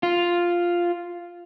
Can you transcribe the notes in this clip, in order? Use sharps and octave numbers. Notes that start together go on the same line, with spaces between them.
F4